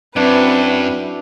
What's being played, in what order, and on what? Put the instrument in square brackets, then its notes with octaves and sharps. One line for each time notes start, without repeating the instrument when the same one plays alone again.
[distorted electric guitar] F#2 [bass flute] C4 [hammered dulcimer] D4 E4 F#4 [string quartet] B4